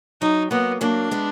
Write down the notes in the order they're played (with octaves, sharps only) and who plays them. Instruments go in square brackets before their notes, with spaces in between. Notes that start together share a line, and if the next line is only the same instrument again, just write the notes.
[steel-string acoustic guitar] F#3 [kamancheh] D#4
[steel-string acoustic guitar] F#3 A#3 [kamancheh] B3
[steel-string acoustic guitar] F#3 A#3 [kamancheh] D4
[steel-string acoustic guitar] G#3 B3